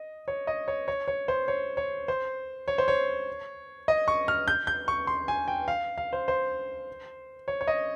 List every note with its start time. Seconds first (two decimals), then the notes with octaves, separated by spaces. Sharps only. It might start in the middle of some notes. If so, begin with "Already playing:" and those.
Already playing: D#5
0.28 C#5
0.47 D#5
0.68 C#5
0.88 C#5
1.08 C#5
1.28 C5
1.48 C#5
1.77 C#5
2.08 C5
2.68 C#5
2.78 C5
2.88 C#5
3.88 D#5
4.08 C#6
4.28 F6
4.48 G6
4.67 G6
4.88 C#6
5.07 C6
5.28 G#5
5.48 G5
5.68 F5
5.98 F5
6.13 C5
6.28 C5
7.48 C#5
7.61 C#5
7.68 D#5